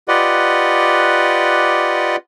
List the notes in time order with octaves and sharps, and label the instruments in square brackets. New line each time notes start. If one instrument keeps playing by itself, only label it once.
[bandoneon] F4 G4 B4 D5 D#5 F#5